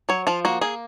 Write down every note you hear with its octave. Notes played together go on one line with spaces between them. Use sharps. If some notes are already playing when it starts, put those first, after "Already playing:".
F#3 C#5
F3 F4
A#3 F#4
A#3 G#4